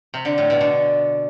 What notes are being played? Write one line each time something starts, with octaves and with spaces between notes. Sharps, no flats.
C3
D3
A2
B2
D3